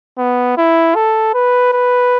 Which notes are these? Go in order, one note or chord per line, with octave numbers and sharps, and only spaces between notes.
B3
E4
A4
B4
B4